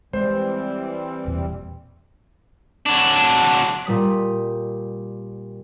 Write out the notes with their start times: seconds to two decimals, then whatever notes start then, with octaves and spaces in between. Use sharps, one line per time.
0.13 E3 G3 G#3 C4 C5
1.26 E1 E2 A#2
2.86 F#3 D4
3.85 A#2 G3 D#6 B6